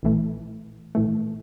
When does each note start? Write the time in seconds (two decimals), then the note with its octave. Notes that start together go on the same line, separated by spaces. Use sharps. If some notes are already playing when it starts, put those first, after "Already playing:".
0.03 A#1 A2 E3 A3
0.95 A#1 A2 E3 A3